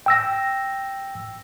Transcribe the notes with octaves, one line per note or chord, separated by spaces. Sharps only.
G5 E6 A#6